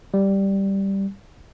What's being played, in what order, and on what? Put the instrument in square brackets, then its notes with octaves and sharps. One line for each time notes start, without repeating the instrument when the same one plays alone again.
[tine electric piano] G3